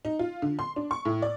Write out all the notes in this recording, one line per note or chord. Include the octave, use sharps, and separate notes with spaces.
D#4
F4
D3
C6
D4
C#6
A2
D5